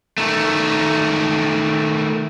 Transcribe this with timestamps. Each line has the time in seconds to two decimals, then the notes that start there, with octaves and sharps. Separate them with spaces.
0.18 D#3 A3